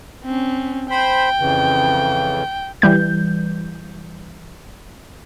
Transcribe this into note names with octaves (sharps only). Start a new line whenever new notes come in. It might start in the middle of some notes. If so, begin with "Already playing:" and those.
C4 C#4
C5 G5 B5
F2 C#3 E3
E3 G3 G6